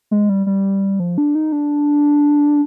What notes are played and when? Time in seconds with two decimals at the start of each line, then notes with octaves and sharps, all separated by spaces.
0.11 G#3
0.29 G3
0.46 G3
1.00 F3
1.18 D4
1.35 D#4
1.52 D4